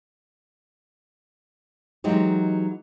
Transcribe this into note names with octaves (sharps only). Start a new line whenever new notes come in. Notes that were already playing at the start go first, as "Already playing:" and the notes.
E3 F#3 G#3 D#4 G4